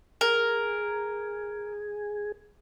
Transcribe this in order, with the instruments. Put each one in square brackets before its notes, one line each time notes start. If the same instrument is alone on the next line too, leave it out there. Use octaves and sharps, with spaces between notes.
[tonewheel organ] G#4 [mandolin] A#4